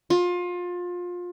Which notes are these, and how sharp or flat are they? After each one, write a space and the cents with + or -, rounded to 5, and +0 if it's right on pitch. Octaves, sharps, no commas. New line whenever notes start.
F4 +25